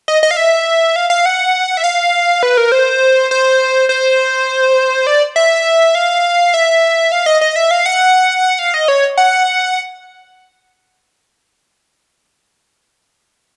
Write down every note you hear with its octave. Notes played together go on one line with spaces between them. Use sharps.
D#5
D#5
F5
E5
F5
F5
F#5
E5
F5
B4
A#4
C5
C5
C5
D5
E5
F5
E5
F5
D#5
D#5
E5
F5
F#5
F5
D#5
C#5
F#5